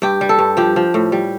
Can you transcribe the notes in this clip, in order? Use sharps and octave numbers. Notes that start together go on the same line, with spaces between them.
G2 G4
G3
A4
G2
F3 G4
F3
A2
G3